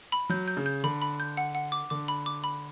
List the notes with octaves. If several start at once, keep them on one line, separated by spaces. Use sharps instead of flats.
B5
F#3 G6
G6
C#3
G6
D3 B5
B5
G6
F#5
F#5
D6
D3 D6
B5
D6
B5